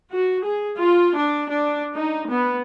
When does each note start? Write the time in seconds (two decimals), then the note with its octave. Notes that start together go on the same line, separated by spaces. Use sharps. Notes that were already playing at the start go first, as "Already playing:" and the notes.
0.11 F#4
0.42 G#4
0.79 F4
1.15 D4
1.49 D4
1.95 D#4
2.27 B3